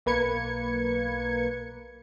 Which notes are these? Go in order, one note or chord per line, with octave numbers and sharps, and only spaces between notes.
B1 A#3 B4 G#6 C#7